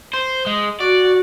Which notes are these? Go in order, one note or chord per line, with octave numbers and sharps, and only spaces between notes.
C5
G#3
F#4 D5